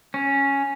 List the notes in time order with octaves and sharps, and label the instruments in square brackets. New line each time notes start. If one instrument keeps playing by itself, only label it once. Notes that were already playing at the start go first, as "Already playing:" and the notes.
[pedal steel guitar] C#4